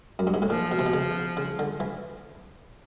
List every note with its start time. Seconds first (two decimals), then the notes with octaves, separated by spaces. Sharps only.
0.19 F#2
0.27 G2
0.34 G#2
0.42 A2
0.50 A#2 F3
0.72 B2
0.79 C3
0.86 B2
0.93 C#3
1.37 C#3
1.59 D3
1.80 E3